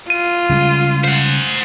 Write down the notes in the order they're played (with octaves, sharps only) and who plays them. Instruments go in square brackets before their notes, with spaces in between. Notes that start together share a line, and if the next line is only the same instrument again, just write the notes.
[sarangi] F4 [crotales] D#7
[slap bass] C#3 G3 G#3
[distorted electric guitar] C5 F#5